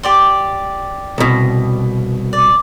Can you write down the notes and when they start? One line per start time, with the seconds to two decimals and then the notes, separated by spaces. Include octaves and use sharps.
0.03 G4 D5 C6
1.18 C2 B2
2.33 D5